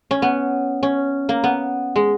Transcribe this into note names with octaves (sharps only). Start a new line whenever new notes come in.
C#4
B3
C#4
A#3
B3
G#3